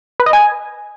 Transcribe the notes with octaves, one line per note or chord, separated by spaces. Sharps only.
B4
D#5
G#5